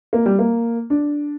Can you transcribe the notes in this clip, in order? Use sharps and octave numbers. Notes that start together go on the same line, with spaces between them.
A#3
G3
A#3
D4